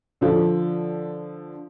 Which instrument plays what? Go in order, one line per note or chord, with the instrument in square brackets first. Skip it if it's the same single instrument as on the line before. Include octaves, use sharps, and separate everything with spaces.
[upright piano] D3 F3